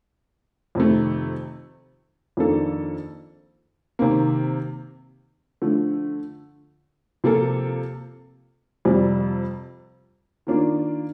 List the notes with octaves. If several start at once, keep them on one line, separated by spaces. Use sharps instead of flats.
F2 C3 D#3 A3
F2 D#3 A#3 D4 A4
C3 D#3 A#3
D3 F3 A3
C3 F3 A#3 F4 A4
F2 C3 G3 C4
D#3 A#3 D4 F4